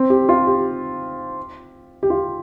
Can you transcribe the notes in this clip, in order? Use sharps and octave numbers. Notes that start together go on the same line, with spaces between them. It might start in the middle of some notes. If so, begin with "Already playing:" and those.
Already playing: C4
G4
F4
G4
G4
F4